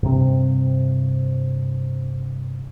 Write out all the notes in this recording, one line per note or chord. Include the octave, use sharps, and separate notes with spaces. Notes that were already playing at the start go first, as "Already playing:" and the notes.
G2 C3 C4